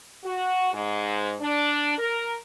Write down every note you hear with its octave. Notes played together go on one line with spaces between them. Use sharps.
F#4
G#2
D4
A#4